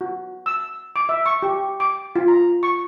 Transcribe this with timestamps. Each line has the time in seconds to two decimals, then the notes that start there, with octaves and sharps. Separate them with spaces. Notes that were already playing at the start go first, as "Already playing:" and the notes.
0.01 F#4
0.46 E6
0.96 D6
1.09 E5
1.26 C#6
1.42 G4
1.80 D6
2.16 F4
2.28 A#5
2.63 C#6